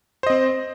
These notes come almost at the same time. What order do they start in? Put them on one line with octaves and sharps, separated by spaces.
C5 D#5 C4